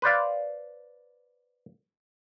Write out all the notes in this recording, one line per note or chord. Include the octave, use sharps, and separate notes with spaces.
B4 C5 D5 F5